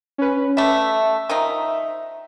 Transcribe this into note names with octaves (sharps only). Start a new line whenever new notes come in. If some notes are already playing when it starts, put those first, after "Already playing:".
C#4 B4
G3 A3 E5
D#3 F3 D#4